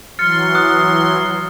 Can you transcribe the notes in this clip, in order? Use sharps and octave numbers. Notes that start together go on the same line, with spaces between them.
E3 F#3 C6 F6 A6 C#7
D#6 F#6